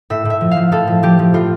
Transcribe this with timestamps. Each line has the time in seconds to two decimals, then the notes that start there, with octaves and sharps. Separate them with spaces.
0.10 A2 E5
0.25 A2 E5
0.41 F3
0.51 F5
0.57 F3
0.72 A2 A4
0.87 F3
1.03 F3 G4
1.19 F3
1.34 A2 F4